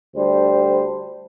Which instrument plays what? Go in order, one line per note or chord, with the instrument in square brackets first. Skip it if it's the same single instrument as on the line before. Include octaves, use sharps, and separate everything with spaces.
[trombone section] D2 G3 D4 C5